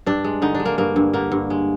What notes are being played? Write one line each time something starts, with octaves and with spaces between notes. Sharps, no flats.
G2 D4
G#3
D3 D#4
G#3 D4
A#3
G2 A#3
G2
D3 A#3
G2
G#3